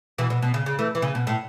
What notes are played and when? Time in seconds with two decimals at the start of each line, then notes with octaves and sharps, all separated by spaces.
0.18 B2 E3
0.30 B2
0.42 B2
0.54 C#3
0.66 C#3
0.79 E3 A3
0.95 E3
1.02 C#3
1.15 B2
1.27 A2